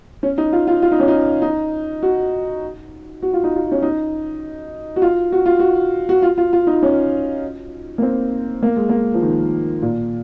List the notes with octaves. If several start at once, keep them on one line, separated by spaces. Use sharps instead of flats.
C#4
D#4
F4
F4
F4
D#4
C#4
D#4
D#4
F#4
F#4
F4
D#4
F4
C#4
D#4
F#4
F4
F#4
F4
F#4
F#4
F4
F4
F4
D#4
C#4
A#3
C4
A#3
G#3
A#3
F3
D#3
A#2